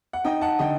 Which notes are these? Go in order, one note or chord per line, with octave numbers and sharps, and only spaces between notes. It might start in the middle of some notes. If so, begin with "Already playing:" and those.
F#5
D#4 D#5 G5
F#5 A5
D3 D#5 G5